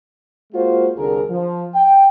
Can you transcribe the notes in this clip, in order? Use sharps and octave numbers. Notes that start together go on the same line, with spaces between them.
G#3 A#3 F4 F#4 C5
C2 D3 G#4 A#4
F3
G5